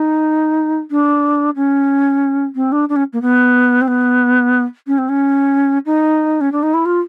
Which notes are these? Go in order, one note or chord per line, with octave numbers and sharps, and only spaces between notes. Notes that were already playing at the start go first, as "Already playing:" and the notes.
Already playing: D#4
D4
C#4
C4
D4
D4
C#4
A#3
B3
C4
B3
C#4
C4
C#4
D#4
C#4
D4
D#4
E4
F4